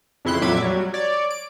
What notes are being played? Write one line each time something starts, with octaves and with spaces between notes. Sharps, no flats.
F2 C#3 E4 C6 F#6
F2 A#2 F#3 E5 D6 G#6
F#3 G3
C#5 D5
D7